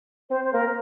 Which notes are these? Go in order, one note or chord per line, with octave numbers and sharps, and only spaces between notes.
C4 C5
C5
A#3 A#4